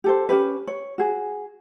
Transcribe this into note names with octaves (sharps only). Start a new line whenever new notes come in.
G4 A4 C5
C#4 D#4 G4 B4
C#5
F#4 G#4